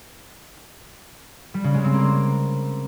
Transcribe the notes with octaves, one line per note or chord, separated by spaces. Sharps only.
G3
C#3
G#3
C4
A#3